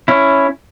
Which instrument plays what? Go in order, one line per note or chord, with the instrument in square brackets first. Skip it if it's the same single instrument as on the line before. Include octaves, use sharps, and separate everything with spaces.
[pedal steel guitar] C#4 E4